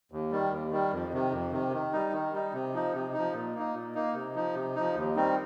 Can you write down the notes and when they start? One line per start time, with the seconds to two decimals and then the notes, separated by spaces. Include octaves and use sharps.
0.12 D#2
0.32 D#3 G3
0.51 D#2
0.71 D#3 G3
0.92 F2
1.13 C3 D#3
1.32 F2
1.52 C3 D#3
1.72 D#3
1.93 G3 D#4
2.13 D#3
2.32 G3 D#4
2.54 C3
2.73 F3 D#4
2.94 C3
3.13 D#4
3.18 F3
3.34 A#2
3.55 A#3 D#4
3.74 A#2
3.95 A#3 D#4
4.15 C3
4.35 F3 D#4
4.55 C3
4.75 F3 D#4
4.95 D#2
5.15 D#3 G3 C4 D#4